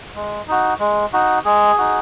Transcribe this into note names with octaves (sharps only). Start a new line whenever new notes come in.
G#3
D#4 F#4
G#3
D#4 F#4
G#3 G#4
D#4 F#4